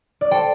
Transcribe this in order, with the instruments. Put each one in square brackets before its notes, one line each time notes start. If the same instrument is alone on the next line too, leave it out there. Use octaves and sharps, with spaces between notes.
[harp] D5
[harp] A4 C5 [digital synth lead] G5